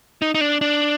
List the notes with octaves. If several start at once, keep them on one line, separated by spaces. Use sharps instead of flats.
D#4
D#4
D4
D4